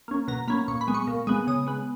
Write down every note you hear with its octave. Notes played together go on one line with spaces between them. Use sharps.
A#3 C#4
B2 A#5
A#3 C#4 B5
A#2 C#6
B5
G#3 B3
C#6
A#2
G#3 B3
C#3 D#6
G#3 B3